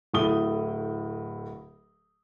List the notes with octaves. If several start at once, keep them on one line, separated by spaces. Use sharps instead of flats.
D1 A2 D#6 G7